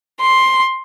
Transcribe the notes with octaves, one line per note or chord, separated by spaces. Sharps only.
C6